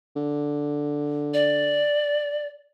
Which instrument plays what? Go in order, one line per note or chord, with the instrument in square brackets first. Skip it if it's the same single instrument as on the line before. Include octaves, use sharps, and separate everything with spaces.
[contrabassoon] D3
[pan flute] D5